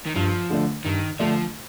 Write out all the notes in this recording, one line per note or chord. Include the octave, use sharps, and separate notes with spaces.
D#3
G2 F3
D3 A3 D4
G2 D#3
D3 F3 A3 D4